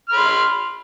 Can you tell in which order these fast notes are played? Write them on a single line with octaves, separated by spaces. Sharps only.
F6 B5 C6